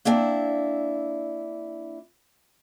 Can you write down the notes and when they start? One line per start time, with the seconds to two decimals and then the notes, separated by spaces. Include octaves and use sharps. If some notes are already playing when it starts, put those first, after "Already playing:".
0.05 A#3 C4 D4 E4